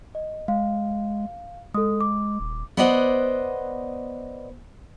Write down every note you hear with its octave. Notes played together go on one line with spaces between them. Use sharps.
D#5
G#3 F5
G#3 A4 D#6
D6
D#1
B3 B4 C5 D5 D#5 F#5